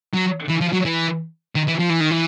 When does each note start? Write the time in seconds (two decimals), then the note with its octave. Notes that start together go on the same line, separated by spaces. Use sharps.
0.14 F#3
0.50 E3
0.61 F3
0.73 F#3
0.85 E3
1.55 D#3
1.67 E3
1.79 F3
1.89 E3
2.00 D#3
2.11 E3